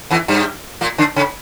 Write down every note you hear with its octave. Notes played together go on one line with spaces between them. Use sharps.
E2 E3
G2 G3
A#2 A#3
D3 D4
C#3 C#4